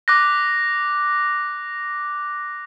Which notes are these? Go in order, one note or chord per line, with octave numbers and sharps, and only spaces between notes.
D6 F#6 A#6